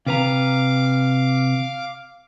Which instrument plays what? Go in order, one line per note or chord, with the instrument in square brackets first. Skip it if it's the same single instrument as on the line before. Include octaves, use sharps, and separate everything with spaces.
[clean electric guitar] C3 B4 A#5 [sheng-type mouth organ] F5 D6